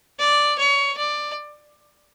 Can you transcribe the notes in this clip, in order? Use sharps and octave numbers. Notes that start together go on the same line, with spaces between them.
D5
C#5
D5